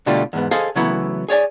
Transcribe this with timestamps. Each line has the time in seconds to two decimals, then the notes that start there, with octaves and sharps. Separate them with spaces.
0.06 B2 D3 G3 A3 F4
0.33 E2 G#2 B3
0.51 G#4 A4 C5 D#5 F5
0.76 C#3 E3 F#3 A3 B3 E4
1.29 G#4 C#5 D5 G#5